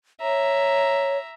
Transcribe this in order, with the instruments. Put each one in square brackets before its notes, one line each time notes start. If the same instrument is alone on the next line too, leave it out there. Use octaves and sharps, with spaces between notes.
[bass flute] C#5 [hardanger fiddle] E5 A#5